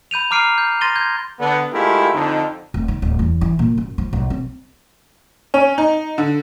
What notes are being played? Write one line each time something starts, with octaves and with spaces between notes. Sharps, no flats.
B5 G6 D#7 F7
A#5 D6 F6 C7 D7 D#7
G6
C6 A6 A#6 D#7 G7
G6 G#6
D3 B3
G#3 A3 E4 F4 G4 A#4
F2 D3 D#4
F1
D#3
D1
E2
E3
A#2
F#2
F3
B1
C4
C#4
D#4
D3